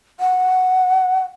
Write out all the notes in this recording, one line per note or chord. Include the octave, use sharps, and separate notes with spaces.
F#5